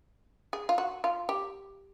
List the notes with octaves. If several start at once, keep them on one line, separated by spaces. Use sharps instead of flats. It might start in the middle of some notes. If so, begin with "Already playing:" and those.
G#4
F4
F#4
F4
G4